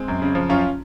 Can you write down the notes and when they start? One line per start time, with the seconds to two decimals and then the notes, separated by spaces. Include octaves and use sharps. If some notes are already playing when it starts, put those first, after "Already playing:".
Already playing: G#3 C4
0.08 F#2
0.22 C#3
0.35 F3
0.49 F#2 C#4 F4